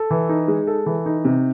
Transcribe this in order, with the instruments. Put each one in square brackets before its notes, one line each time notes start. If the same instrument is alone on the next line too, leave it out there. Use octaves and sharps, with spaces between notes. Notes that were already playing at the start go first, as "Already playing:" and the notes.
Already playing: [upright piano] A4
E3
D#4
G#3
A4
E3
D#4
C3